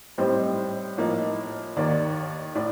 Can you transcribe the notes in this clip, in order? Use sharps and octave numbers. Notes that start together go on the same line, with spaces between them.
A2 G3 C4 D#4 C5
A2 F3 A#3 D#4
D#2 D#3 A#3 D5
A2 D5